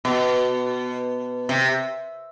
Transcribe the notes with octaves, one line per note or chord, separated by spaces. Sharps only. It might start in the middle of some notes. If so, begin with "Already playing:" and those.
B2
C3